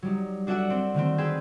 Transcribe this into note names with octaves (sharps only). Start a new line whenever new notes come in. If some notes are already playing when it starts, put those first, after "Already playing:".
F#3 G3 D#4
D4 F#4 A4 E5 F#5 D6
C4 D4
D3 D#3 A3 C4
G#4 B4 G5 C6 E6